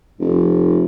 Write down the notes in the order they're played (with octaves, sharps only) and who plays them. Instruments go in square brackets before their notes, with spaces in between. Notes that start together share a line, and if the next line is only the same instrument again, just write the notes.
[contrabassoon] F1